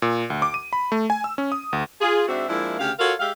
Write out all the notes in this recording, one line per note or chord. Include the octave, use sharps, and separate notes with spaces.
A#2
D2
D6
D#7
B5
A3
G#5
E6
C#4
D#6
D2
F4 G#4
G#2 C4 D4 F#4 E5
F3 G#3 A#3 D4 E4
D2 C#3 G4 F5
F4 F#4 A4 A#4 C#5 F5
G#3 G4 E5 F5